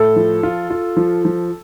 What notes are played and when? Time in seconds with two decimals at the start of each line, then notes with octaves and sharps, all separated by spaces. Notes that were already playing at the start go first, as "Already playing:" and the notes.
Already playing: A2 A4
0.16 F3
0.43 F4
0.70 F4
0.97 F3
1.25 F3